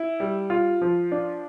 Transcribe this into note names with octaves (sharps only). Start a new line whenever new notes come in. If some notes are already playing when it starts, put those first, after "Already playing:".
Already playing: E4
G3
F4
F3
D4